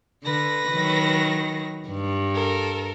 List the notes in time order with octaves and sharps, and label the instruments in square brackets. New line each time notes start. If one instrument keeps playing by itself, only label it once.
[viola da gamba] D3 [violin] B4 A#6
[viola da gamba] D#3 F#3
G2
[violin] A4 A#4